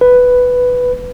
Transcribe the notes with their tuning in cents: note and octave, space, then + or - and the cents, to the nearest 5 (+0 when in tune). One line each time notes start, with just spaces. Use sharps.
B4 +5